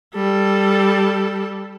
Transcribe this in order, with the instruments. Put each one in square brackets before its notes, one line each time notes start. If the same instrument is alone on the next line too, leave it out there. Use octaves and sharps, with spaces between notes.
[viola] G3 A4